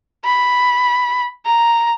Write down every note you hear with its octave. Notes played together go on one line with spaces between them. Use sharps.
B5
A#5